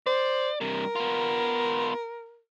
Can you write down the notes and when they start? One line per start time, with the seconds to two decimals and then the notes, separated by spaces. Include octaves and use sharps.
0.06 C5 D5
0.61 G2 C3 A#4
0.95 B3 F4